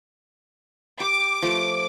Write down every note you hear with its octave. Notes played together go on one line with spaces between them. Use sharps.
G4 D6
F3 A3